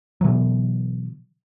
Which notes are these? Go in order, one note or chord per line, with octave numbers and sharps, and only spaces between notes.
B2 D3 E3 F#3